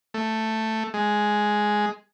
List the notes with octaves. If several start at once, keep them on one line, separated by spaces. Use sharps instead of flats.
A3
G#3